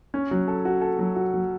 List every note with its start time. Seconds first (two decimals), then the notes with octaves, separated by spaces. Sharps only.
0.14 C#4
0.31 F#3
0.48 A4
0.65 F#4
0.82 A4
0.99 F#3
1.16 F#4
1.34 F#3